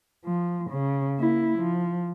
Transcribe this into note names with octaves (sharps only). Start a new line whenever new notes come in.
F3
C#3
A#3 E4
F3